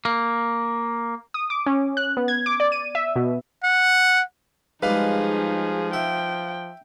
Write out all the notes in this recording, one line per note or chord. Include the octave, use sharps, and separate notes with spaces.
A#3
D#6
D6
C#4
F#6
B3
G#6
D6
D5
D#7
E5
B2
F#5
F3 G3 G#3 D#4 G#4 B4 F5
E5 G5